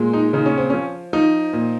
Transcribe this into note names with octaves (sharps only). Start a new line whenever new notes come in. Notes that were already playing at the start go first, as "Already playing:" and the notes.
Already playing: A#2 G#3
D#4
C#3 D#4
C#4
C4
F3 C#4
F3 D#4
A#2